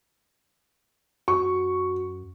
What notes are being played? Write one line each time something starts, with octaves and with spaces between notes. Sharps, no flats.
F#2 F#4 C#6